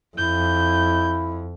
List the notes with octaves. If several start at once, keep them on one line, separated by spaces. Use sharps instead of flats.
F2 E4 G6